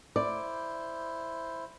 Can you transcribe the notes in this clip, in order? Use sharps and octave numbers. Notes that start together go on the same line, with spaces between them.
E4 C5 D5